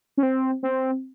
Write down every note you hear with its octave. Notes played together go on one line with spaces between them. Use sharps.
C#4
C4
C4